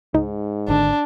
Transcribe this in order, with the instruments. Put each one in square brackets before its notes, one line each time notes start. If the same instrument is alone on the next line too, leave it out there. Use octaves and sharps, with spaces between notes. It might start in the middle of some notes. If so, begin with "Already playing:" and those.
[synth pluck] C#2 D#4 [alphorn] G#2
[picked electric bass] G#1 D3 [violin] D4